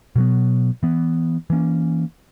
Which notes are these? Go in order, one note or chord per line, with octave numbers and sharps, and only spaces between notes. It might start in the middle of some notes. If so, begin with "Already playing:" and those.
B2 F#3 B3
E3 B3
E3 A#3 C#4